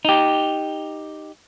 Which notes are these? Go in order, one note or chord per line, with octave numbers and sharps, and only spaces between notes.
D#4 G4